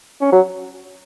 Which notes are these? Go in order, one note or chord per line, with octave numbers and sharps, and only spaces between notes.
C#4
F#3